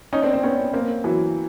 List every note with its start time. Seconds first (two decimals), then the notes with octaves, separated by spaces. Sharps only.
0.13 C#4 D#4
0.22 C4 D4
0.33 C4 D4
0.43 B3 C#4
0.73 A#3 C4
1.04 E3 F#3